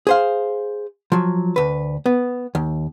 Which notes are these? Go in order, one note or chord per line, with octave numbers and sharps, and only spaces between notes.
G#4 C5 F5
F3 F#3
D2 B4
B3
D#2